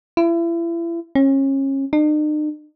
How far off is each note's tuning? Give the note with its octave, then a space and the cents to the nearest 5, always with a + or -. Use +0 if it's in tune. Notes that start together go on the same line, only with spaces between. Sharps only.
E4 +35
C#4 -30
D#4 -45